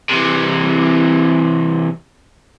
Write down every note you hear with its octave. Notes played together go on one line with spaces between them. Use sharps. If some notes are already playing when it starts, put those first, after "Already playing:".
C3 E3